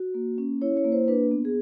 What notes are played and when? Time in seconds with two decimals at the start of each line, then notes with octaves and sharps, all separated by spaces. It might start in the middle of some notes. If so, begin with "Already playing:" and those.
Already playing: F#4
0.14 A#3
0.38 C#4
0.62 E4 C#5
0.77 C#5
0.84 A#3
0.92 C5
1.08 D4 B4
1.31 B3
1.45 G#4